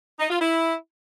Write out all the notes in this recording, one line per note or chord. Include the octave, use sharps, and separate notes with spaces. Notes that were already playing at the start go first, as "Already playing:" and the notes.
D#4
F4
E4